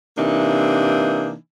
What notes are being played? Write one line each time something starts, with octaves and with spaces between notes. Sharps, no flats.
C3 E3 A#3 D4 D#4